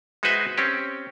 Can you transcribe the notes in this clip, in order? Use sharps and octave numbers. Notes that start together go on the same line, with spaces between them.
G#3 D#4 F#4 B4 C5 E5
C4 C#4 G4